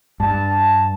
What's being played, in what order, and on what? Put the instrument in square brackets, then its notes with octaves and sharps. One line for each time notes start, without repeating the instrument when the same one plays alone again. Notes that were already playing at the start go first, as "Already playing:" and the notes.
[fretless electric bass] G2 [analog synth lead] A5